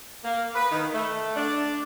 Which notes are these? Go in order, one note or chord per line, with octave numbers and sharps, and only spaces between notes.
A#3
B4
D#3
A3
D4